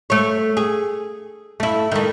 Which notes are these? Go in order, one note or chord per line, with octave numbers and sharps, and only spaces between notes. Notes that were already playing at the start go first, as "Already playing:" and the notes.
A3 C#5
G#4
A3 E4
D#3 A3